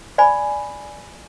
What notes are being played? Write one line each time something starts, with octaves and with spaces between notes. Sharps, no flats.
D5 G#5 B5